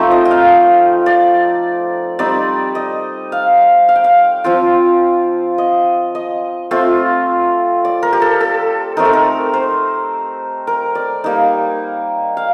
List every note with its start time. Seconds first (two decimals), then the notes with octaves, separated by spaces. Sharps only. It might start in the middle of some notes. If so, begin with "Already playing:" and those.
Already playing: F3 A3 C4 D#4 G5
0.11 D#5
0.25 G5
0.31 F5
1.06 D5
2.19 G3 C4 D#4 D5
2.75 D#5
3.32 F5
3.89 F5
3.96 G5
4.04 F5
4.44 F3 C4 F4 G5
5.58 D#5
6.15 D#5
6.71 A3 C4 F4
7.85 D5
8.03 A#4
8.13 G4
8.22 A4
8.41 A4
8.97 A3 C4 D#4 A#4
9.05 A4
9.13 A#4
9.54 C5
10.67 A#4
10.95 D5
11.24 G3 A#3 D#4
12.37 F5